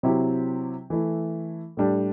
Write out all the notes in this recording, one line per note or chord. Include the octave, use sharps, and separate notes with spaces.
C3 F#3 C4 E4 G4
E3 A3 E4
A2 G3 D4